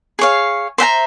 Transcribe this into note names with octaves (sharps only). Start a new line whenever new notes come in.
G#4 C#5 F5
C5 E5 G5 A#5